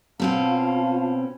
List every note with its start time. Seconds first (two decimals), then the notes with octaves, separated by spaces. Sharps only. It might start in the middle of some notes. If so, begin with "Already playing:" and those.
0.20 B2 C4 C#4 F4 F5 A5